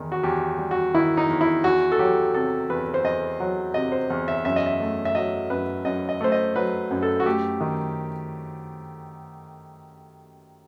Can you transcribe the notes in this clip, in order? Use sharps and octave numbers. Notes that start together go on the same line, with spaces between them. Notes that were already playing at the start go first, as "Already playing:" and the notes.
Already playing: E2 D#3
F#4
E2 G4
G3
F#4
D#3 E4
D#4
E2
E4
E2 F#4
A4
F#3 G4
C3 A4
E2 B4
C5
E2 D#5
F#3
C3 D#5
C5
E2
E5
F#2 E5
D#5
E5
A3
E5
F#3 D#5
F#2 B4
F#2 D#5
D#5
A3 C5
D#5
F#3 B4
F#2
A4
F#4
A3 G4
D#3